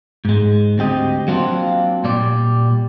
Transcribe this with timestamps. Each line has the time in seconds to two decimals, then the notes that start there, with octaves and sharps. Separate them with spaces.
0.25 G#2 G#3
0.78 D2 C4 G4 D#5
1.28 F#3 A#3 C4 D4 F4
2.04 A#2 G3 D5